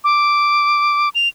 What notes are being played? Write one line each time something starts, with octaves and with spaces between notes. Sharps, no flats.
D6
F7